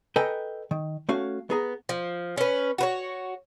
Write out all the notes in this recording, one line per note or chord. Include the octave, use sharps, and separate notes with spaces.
A4 B4 D#5 G5 G#5 A#5
D#3
A3 C#4 F#4 F5
B3 G#4 A#5
F3
C#4 B4
F#4 B4 C#5